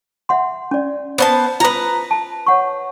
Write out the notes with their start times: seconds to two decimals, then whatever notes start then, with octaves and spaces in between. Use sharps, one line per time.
0.29 E5 F#5 C6
0.71 C#4 D5
1.18 B3 C5 A5
1.60 F4 B4 C5 A#5 D#6
2.11 A5
2.46 C#5 F#5 C#6